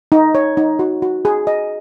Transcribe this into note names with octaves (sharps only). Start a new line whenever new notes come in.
D#4
C#5
D#4
F#4
F#4
G#4
D#5